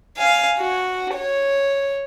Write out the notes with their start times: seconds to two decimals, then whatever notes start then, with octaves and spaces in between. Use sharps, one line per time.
0.18 F5 G#5
0.58 F#4
1.14 C#5